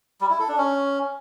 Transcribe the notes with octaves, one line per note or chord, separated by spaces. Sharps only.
G3
E4
A4
D4
C#4